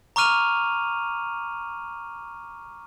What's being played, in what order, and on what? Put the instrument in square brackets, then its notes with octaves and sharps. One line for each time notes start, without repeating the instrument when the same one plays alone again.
[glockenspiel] A#5 C#6 D6 F6 D#7 F7